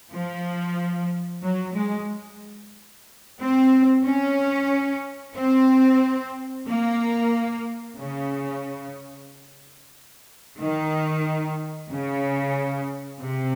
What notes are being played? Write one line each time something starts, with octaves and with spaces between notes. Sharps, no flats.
F3
F#3
G#3
C4
C#4
C4
A#3
C#3
D#3
C#3
C3